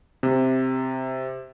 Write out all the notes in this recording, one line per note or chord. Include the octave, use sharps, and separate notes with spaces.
C3